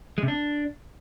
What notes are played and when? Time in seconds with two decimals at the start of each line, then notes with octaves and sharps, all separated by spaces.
0.18 G#3
0.23 C3
0.28 D4